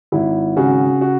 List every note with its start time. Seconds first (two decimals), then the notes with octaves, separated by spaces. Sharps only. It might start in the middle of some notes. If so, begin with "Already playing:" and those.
0.12 G#1 E4
0.57 C#3 F#4
1.01 F#4